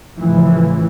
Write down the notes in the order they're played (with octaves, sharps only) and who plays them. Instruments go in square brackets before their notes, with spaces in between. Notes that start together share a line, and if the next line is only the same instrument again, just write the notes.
[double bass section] A1 A2 C#3 E3 F3